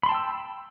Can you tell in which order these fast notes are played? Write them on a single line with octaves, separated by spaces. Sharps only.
B5 C6 A5 G5 E6